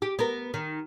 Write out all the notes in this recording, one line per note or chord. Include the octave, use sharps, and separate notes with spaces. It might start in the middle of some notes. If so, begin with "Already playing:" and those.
G4
B3 A#4
D#3